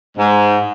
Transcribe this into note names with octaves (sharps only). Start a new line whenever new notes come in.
G#2